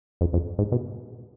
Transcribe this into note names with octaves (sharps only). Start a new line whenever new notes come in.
F2
F2
G#2
B2